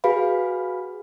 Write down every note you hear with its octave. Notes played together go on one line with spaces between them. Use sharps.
F#4 G#4 B4 F5 B5